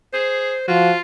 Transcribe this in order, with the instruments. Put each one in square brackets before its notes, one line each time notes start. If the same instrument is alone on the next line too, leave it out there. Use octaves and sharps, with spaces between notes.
[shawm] G#4 [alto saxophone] C5
[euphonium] F3 [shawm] F4 [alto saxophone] F#4